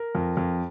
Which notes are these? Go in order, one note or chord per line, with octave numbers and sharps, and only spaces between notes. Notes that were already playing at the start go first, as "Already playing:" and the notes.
Already playing: A#4
F2
F2